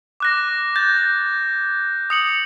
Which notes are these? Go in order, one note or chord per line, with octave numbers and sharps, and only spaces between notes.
D6 F#6 A#6
G6 A6
D#6 C#7 F#7